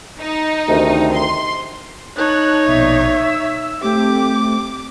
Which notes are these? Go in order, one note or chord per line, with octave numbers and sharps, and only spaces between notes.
D#4
D2 C3 D#3
C6
D#4 C#5 A5 F#6
A#1 B2 D5 E5
E6
A3 C4 G4 D6